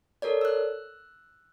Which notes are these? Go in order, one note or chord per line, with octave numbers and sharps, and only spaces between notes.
A4 A#4 C#5 D5
E6 F#6